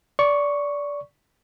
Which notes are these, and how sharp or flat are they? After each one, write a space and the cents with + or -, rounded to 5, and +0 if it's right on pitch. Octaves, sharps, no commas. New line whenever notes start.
D5 -20 C#6 +0